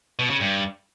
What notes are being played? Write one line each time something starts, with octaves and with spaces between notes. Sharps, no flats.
B2
C#3
G2